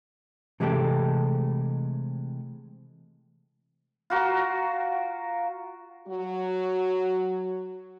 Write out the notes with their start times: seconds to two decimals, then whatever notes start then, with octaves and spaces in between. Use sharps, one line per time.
0.60 C3 E3 G#3 A3 G4 A4
4.10 F4 F#4 A#4
6.08 F#3 F#4